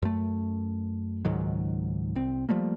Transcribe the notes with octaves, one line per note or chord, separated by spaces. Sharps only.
F#2 A3
C#2 G#2 D#3 F#3
C2 C4
F3 G3 A3 A#3